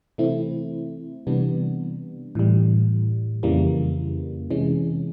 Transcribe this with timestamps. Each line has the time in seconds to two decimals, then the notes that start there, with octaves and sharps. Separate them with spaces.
0.18 C3 E3 A3 C4 E4
1.27 C3 E3 G3 B3 D4
2.35 A2 E3 G3
3.43 F2 C#3 E3 G3 A#3
4.51 C3 E3 G#3 C#4